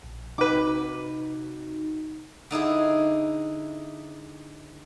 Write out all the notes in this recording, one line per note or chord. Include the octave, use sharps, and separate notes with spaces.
A#1
C3 D#4 F#4 B4 D6
D3 D#4 E4 G#4